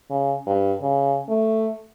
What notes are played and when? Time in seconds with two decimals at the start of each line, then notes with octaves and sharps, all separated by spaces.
0.10 C#3
0.47 G2
0.81 C#3
1.29 A3